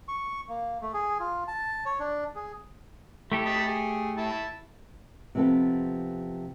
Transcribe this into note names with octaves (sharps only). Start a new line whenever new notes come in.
C#6
A#3
A3
G#4
F4
A5
C#5
D4
G#4
A3 E4 G4 A4
D#5 A5 B5
G#4
E4 A5
C3 F3 B3 A4